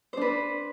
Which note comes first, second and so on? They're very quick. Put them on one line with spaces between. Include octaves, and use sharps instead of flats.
C5 D4 B4